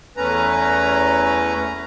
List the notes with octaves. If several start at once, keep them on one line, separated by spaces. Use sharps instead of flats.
E2 A3 C#4 B4 A#5